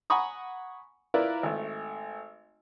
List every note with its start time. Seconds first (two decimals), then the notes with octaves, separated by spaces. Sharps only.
0.10 F#5 G#5 A#5 B5 C#6 D#6
1.14 E4 F4 A#4 B4 D5
1.43 G#1 A3